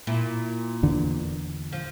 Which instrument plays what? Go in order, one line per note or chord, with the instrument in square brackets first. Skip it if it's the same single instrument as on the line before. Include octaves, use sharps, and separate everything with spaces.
[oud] A#2 E4
[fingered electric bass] E2 D3
[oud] F3